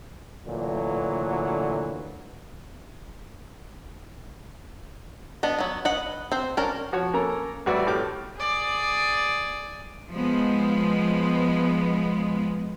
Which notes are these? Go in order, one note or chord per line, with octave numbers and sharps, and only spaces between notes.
D2 A#2 D3 E3 F#3
B3 D4 D#5
F#3 B3
B4 D#5 F#5
C4 C5
C#4 D4 A#4
F3 F#4 C#5
A#3 C#4 A4 A#4 A#5
A1 G3 F#4 B4 D5 E5
A2 G4 D6 F6
G#4 D5
F3 G#3 B3